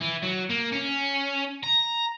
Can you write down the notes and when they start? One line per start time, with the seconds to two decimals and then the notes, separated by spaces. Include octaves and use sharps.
0.01 E3
0.22 F#3
0.49 A#3
0.72 C#4
1.64 A#5